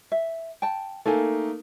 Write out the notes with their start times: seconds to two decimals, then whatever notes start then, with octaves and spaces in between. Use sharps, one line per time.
0.12 E5
0.62 G5 A5
1.06 A3 A#3 D#4 A4 G#5